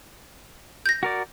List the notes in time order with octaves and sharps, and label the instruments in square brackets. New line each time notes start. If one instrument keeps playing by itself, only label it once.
[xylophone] G6 A#6
[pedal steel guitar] F#4 A#4 D5